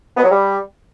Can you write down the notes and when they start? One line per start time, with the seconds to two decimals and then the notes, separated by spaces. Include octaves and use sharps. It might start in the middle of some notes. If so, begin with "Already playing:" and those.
0.16 B3
0.24 F#3
0.31 G3